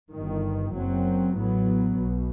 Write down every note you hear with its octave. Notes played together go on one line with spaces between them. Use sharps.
G1 G2 D#3
F#1 F#2 F#3 C4
A1 A2 F#3 B3
B1 B2